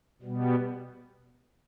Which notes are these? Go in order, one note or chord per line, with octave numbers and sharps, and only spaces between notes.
B2 G3 B3